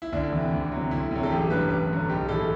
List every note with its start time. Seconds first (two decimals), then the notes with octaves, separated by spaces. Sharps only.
0.02 E4
0.12 D2 D4
0.32 C3 E3
0.52 D2
0.72 C3 F#3
0.91 D2 E4
1.11 C3 F#3
1.23 A4
1.31 A1 G4
1.50 G2 F#3 B4
1.69 A1 B4
1.89 G2 D3 F#3
2.09 B1 G4
2.29 A2 E3 A4